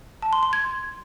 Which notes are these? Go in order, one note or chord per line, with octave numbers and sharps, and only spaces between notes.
A5
C6
C6
G#6